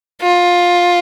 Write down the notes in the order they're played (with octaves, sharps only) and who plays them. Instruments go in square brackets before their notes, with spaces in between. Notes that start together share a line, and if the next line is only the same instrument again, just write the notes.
[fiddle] F4